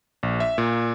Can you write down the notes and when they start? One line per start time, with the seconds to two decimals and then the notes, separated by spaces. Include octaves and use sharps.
0.23 A#1
0.40 E5
0.58 A#2